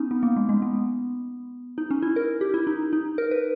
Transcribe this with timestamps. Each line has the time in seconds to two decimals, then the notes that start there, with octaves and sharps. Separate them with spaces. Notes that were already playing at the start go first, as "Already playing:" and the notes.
Already playing: B3 C#4 D#4
0.11 B3
0.23 A#3
0.36 G#3
0.49 G#3
0.62 B3
1.78 D#4
1.91 C#4
2.03 E4
2.16 A#4
2.41 G4
2.54 E4
2.67 D#4
2.93 D#4
3.18 A#4
3.31 B4